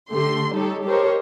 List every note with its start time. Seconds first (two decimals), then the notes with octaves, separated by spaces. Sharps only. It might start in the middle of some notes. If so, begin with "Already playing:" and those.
0.11 D3 A3 G4 C6
0.53 G3 D#4 G4 A4 C#5
0.85 G4 A4 A#4 C5 C#5 D#5